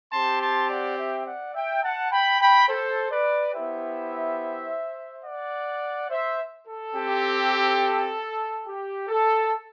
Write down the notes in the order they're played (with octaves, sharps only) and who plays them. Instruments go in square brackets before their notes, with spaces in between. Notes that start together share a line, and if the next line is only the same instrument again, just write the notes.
[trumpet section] C4 G4 A5 C6
A5 C6
D5 F#5
E5 G5
D5 F#5
E5 G5
F#5 A5
G5 B5
G5 B5
A4 C5
B4 D5
B3 E4 G4 C5 E5
D5 F#5
C5 E5
A4
C4 G4
G4
A4